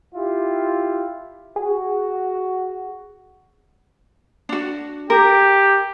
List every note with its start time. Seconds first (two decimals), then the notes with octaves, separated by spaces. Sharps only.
0.14 E4 F4 G4
1.56 F#4 G#4
4.49 D4 F#4
5.10 G4 A#4